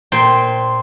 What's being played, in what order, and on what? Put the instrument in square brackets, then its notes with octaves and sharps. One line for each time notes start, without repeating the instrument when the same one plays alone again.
[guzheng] A#2 C5 G5